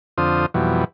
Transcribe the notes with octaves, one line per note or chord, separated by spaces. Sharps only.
F2 D3 C4 F4 C5 D#6
F2 B2 E3 F#3 G3